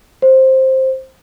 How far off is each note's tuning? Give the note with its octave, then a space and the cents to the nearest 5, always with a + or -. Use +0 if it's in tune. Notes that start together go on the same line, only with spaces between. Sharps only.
C5 +10